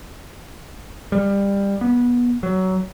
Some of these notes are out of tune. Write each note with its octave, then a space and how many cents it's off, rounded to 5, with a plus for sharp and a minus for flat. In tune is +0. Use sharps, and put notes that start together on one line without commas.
G3 +20
B3 -20
F#3 +20